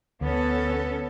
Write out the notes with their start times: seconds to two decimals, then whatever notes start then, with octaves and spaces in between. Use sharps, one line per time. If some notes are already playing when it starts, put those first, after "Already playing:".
0.21 D2 B3 C#4 A4